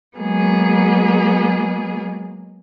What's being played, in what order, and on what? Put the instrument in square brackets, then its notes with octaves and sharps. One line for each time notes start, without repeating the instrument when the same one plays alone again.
[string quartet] F#3 G#3 A#3 B3 G#4